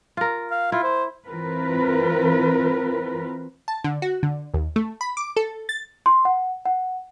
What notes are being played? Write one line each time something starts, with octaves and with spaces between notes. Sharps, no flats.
F4 A#4
F5
E4 F4
C5
E3 C4 F4 A#4 B4
A5
D3
F#4
D3
D#2
A3
B5
D6
A4
A6
C6
F#5
F#5